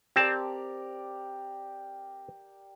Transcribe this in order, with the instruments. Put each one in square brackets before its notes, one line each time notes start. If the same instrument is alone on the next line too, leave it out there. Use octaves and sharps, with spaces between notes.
[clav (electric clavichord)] C4 A5 [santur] G4 A#4 D5